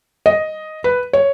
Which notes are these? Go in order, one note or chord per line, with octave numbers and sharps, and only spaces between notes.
D#5
B4
C#5